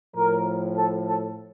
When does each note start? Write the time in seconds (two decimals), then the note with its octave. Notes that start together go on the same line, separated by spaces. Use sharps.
0.16 A2 F3 A#4
0.77 A4
1.07 A4